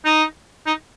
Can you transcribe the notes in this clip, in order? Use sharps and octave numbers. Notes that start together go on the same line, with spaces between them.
D#4
D#4